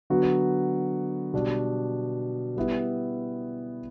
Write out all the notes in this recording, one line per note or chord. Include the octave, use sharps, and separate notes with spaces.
D3 F#3 B3 F#4
B2 G3 D4
G3 B3 E4